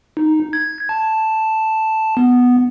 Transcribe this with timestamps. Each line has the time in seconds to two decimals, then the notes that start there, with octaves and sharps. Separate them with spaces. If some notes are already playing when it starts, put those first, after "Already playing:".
0.17 D#4
0.53 G#6
0.89 A5
2.17 B3